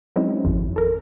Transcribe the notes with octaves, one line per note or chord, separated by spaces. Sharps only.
F#3 G#3 C4 C#4 D#4 E4
G#1 F2 C3
A4 A#4